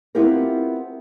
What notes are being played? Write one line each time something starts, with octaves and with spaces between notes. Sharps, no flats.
B3 C4 E4 F4 G4 A#4